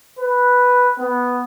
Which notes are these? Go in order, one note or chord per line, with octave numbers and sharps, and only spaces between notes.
B4
B3